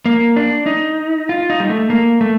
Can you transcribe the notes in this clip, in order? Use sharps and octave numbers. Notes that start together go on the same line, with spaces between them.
A#3
D4
D#4
F4
D#4
G3
A3
A#3
A3